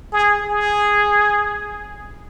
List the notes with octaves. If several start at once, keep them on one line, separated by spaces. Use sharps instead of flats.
G#4
G#4